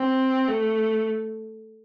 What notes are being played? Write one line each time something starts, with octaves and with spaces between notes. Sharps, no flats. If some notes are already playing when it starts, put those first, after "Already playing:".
Already playing: C4
A3